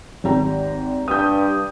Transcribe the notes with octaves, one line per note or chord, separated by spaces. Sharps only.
G#1 G4 A#5
G2 D#6 G6